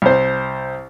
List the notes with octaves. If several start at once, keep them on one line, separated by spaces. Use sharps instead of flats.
C2 C5